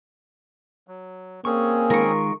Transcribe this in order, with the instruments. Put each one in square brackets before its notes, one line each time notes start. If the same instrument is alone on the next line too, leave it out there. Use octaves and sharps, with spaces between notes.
[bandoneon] F#3
[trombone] A#3 [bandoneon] C4 C#4 G#4 [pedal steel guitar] C#6
[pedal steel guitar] D#3 G#3 F4 [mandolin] A#4 C#6